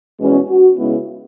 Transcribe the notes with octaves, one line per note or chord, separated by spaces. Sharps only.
E2 B2 G#3 C#4
F#4
C#3 G#3 B3 E4